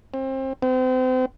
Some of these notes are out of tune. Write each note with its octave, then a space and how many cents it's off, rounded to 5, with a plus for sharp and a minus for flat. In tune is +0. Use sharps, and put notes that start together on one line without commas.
C4 +30
C4 -35